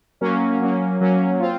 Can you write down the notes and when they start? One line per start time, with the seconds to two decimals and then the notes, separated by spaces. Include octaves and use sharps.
0.21 F#3 A#3 C#4
0.60 F#3 A#3 C#4
1.01 F#3 A#3 C#4
1.40 C4 F4